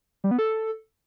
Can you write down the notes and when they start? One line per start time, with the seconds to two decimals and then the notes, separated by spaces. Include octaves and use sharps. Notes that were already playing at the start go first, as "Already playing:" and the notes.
0.24 G3
0.31 B3
0.39 A4